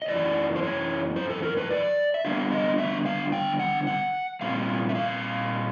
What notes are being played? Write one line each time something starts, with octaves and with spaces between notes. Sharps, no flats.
D#5
F#2 C#3 E3 D5
C5
C#5
C5
A4
A#4
B4
D5
E5
D3 G3 B3 F5
D#5
E5
F5
G5
F#5
F#5
A#2 G3 C4 F5
E5
F5